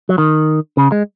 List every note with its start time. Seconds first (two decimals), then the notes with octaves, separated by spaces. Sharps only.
0.09 F#3
0.18 D#3
0.77 C#3
0.92 G#3